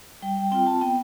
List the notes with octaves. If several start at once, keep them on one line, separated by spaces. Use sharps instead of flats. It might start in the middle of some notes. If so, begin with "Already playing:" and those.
G3 G5
G5
C4 F4 G5
A5
B3 G5